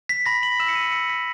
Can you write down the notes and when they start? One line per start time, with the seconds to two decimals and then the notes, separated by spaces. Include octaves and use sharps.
0.09 B6
0.26 B5 A#6
0.43 F#7
0.60 E6 E7
0.68 C#7
0.75 D#7
0.92 E6 C#7
1.10 B6